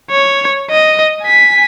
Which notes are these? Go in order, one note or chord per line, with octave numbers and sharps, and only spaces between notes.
C#5
D#5
G#5 B6